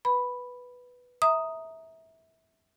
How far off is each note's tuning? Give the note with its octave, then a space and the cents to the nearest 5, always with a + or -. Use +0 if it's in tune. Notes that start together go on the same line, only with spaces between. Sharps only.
B4 +0 B5 +0
E5 -20 A#5 +0 D#6 +0